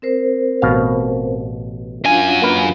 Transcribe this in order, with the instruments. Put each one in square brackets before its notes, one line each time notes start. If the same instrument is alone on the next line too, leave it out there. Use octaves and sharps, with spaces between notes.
[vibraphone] C4 A#4 C5
[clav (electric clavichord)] A1 B2 F5
[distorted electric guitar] F#2 G#5 [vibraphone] D4 F4 F5
[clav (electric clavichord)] A#3 B4